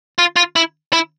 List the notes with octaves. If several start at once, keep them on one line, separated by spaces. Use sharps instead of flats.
F4
F4
E4
E4